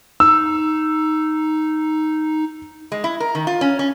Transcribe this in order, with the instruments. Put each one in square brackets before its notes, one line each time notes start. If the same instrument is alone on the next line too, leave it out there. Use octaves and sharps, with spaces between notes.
[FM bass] D#4 [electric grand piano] E6
[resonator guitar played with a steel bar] G#3
E4
A#4
D#3
F4
C#4
C#4